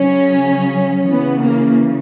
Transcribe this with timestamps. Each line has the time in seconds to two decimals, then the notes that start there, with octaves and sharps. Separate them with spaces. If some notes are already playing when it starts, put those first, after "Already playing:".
Already playing: C#3 F#3 C#4
1.08 C#3 E3 B3
1.40 A#3